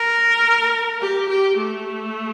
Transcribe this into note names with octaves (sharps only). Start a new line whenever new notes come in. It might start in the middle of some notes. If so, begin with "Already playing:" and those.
Already playing: A#4
G4
G4
A3